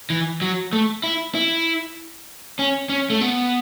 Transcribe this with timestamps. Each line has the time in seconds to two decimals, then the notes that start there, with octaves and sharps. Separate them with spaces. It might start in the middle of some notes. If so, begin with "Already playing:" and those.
0.10 E3
0.42 F#3
0.73 A3
1.04 E4
1.35 E4
2.59 C#4
2.89 C#4
3.10 A3
3.21 B3